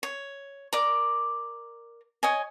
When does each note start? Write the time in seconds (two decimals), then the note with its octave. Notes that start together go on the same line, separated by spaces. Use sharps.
0.03 C#5
0.73 A#4 D5 D6
2.23 C#5 D#5 G#5